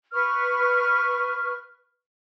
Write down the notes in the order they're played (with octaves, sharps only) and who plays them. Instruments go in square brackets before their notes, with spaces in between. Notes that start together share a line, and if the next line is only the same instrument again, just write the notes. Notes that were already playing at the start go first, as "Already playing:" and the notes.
[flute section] B4 C#6 F6